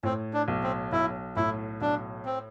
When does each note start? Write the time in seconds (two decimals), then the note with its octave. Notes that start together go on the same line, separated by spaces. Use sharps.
0.03 A2 C4
0.34 D4
0.48 B1
0.63 C4
0.92 B1 E4
1.36 A2 E4
1.81 B1 D4
2.25 C4